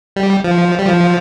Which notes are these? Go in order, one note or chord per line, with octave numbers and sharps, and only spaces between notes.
G3
F3
G3
F3